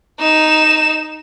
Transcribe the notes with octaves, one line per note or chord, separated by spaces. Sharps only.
D#4 E7